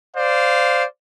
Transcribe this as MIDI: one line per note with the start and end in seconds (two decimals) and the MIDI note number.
0.16 0.85 72
0.16 0.85 74
0.16 0.85 77